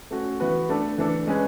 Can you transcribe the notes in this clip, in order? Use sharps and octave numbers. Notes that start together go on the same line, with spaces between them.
A3 C#4 F#4
E3 B3 F#4 B4
A3 D4 A4
E3 A3 D4 A4
G#3 C#4 G#4 B4